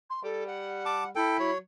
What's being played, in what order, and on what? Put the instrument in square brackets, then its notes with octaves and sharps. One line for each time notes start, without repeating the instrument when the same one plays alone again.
[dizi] C6
[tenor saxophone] G3 [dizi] A4
[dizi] F#5
[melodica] A5 D6
[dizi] E4 [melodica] A4 G5
[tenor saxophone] F#3 [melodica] C#5